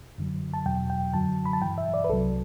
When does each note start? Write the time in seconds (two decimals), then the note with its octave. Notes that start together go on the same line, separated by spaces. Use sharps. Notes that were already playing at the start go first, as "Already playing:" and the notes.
0.18 F#2 D3 F#3
0.54 A5
0.66 E2 B2 F#3 G5
0.90 G5
1.14 F#2 D3 F#3 A5
1.46 B5
1.53 A5
1.62 G2 E3 G5
1.78 E5
1.94 D5
2.04 B4
2.09 C2 C3 F#3 A4